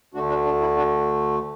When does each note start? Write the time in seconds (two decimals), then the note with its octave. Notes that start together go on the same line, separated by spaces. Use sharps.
0.14 D2 D3 A3 D4 F#4
0.29 D4 F#4
0.45 D4
0.61 E4
0.76 D4 F#4